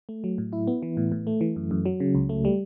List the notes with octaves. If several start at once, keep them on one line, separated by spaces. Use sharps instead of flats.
A3
F#3
A2
E4
B3
E3
A2
A2
A3
E3
F#2
F#2
F#3
C#3
C#2
A3
G3